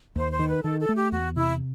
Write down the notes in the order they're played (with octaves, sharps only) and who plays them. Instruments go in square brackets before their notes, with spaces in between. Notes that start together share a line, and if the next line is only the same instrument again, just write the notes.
[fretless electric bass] D#2 [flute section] C5
[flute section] C5
[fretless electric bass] D#3
[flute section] B4
[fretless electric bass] D#3 [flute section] A4
[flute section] A4
[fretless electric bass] A3
[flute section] G4
[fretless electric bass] E2 [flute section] F#4
[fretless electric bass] C3 [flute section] E4